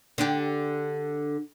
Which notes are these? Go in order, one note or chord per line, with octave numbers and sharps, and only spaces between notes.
D3 D4 G4